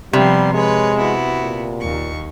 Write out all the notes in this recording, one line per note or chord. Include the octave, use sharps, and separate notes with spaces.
C3 F3 G3 B3 C6
G#3 B4 C#5
B3 E4 F#4
A#2
D#2 C#6